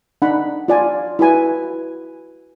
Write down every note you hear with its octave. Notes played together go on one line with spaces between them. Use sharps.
D4 D#4 F#5 B5
F4 D5 G#5
E4 F#4 B4 G#5